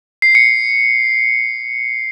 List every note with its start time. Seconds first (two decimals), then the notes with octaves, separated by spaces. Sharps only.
0.22 C7
0.35 C#7